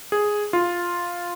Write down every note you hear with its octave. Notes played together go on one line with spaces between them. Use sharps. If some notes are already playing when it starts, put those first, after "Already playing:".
G#4
F4